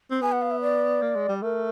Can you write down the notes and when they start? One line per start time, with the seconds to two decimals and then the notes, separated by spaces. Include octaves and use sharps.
0.11 C4
0.21 B3 G#5
0.32 F#5
0.42 F5
0.51 E5
0.62 D5
1.02 A#3
1.15 G#3
1.28 G3
1.42 A3 A#4